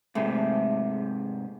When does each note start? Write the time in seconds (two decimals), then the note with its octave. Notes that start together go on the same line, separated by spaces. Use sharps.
0.15 G#2 C3 A3